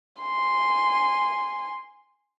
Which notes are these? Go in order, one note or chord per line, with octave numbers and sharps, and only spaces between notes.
G#5 C6